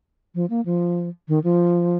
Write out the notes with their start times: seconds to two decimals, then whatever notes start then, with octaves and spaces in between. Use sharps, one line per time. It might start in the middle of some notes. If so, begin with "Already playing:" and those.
0.35 F3
0.50 A#3
0.65 F3
1.28 D#3
1.44 F3